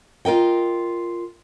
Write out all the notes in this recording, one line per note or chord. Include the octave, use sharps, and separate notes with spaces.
F4 A#4 D#5 G5